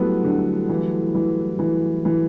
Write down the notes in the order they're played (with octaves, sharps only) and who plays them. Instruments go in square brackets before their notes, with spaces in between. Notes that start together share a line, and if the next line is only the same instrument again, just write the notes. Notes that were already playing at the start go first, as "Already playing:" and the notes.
Already playing: [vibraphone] F#3 G3 A3 E4 F#4 G4 A4 [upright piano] B3
[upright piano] D3
E3
E3
E3
E3